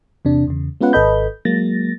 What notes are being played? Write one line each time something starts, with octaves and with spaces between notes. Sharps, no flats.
E2 C3 D4
E2 C#3
G#3 B3 C#4 F4 B4 F#5
G#1 A4 B4 D#5 B5 G6
F#3 G#3 A#3 A6 A#6